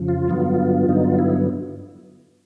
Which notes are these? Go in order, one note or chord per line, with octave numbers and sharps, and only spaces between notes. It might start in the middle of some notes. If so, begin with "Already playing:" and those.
Already playing: F2 C#3 F3
F4
G2 D3 F#3 B3
G2 D3 F#3 B3 D#4
F4
E4